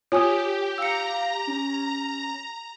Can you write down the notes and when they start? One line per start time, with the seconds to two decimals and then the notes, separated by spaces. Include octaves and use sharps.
0.12 F4 G4 C#5 G#5 D#6
0.78 F5 A#5 E6 C#7
1.47 C#4